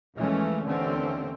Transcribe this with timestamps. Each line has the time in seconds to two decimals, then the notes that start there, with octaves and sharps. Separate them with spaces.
0.16 D#2 E3 F3 G#3 A3 C#4
0.64 D#2 D3 E3 A3 C4 C#4